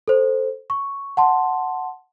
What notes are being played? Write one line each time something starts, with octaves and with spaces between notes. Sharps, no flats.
A4 C5
C#6
F#5 A5 C6